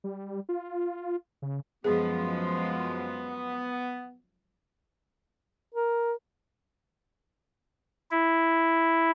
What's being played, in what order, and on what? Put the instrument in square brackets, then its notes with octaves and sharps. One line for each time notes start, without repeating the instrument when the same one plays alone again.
[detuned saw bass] G3
F4
C#3
[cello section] F#2 F3 G#3 [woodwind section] B3 [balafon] G#4
[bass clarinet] A#4
[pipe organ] E4